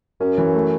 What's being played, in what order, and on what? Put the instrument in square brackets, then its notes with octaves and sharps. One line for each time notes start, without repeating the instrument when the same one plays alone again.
[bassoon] F#2 [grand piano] C#4
[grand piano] E3
A3